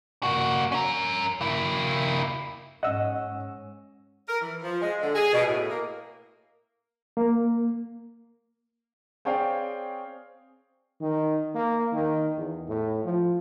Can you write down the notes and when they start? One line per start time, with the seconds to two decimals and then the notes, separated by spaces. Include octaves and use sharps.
0.23 A#3 F#4
0.72 C#4 A#4
1.41 A#3 E4
2.83 G#2 C#4 D#5 F#5 E6
4.28 A#4
4.41 E3
4.63 F3
4.81 G#3
5.01 D3
5.15 G#4
5.33 B2
5.46 A2
5.69 A#3
7.17 A#3
9.25 C4 G#4 C#5 D5 F5 G5
11.01 D#3
11.55 A#3
11.92 D#3
12.37 E2
12.68 A2
13.05 F3